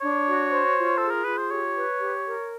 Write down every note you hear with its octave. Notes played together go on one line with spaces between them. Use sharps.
D4 C#5
F#4
C5
F4
G#4 A4
A#4
F4 B4
C5
G4 C#5
B4
G4
A#4